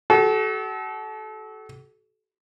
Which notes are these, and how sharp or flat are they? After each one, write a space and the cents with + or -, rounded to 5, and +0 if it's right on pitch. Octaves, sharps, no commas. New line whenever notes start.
F#4 +40 A4 -30